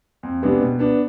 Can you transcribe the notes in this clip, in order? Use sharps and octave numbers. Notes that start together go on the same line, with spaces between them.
F2
C3 G#3 B3 D4
B2
B3 D4